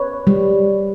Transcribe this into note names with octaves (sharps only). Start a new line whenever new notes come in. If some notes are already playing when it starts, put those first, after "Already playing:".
Already playing: B4 C#5
G3